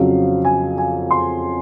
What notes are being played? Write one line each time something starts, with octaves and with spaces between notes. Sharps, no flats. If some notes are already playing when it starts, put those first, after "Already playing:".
Already playing: F2 C#3 F#3 F5
G#5
G#5
C6